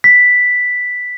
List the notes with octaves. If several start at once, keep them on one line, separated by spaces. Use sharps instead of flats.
B6